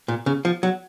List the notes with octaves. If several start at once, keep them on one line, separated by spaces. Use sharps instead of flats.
A#2
C#3
F3
F#3